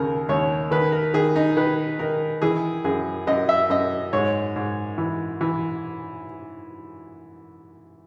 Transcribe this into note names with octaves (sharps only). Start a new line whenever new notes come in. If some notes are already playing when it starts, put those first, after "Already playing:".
Already playing: D#2 C#3 A#4
D#2 C#5
D#3 B4
A#4
D#3 G#4
D#4
D#3 B4
D#3 A#4
E3 G#4
F#2 G#4
F#2 D#5
E5
F#2 D#5
G#2 C#5
G#2
E3
E3